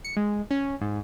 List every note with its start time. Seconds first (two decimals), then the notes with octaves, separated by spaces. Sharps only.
0.04 C#7
0.16 G#3
0.51 C#4
0.81 G#2